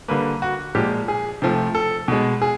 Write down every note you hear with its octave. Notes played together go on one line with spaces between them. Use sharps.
D3 G3 A#3 B4
F#4
A#2 F3 G#3 G4
G#4
C3 F3 A3
A4
B2 G#3
G#4